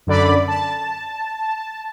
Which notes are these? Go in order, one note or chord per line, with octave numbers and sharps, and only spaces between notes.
F#2 D3 D5 B5
A5